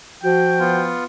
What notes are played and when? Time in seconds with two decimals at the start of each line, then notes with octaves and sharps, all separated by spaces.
0.23 F3 F#4 G5
0.59 B3 F4